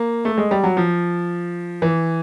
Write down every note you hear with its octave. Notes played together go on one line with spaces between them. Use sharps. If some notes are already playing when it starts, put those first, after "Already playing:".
Already playing: A#3
A3
G#3
G3
F#3
F3
E3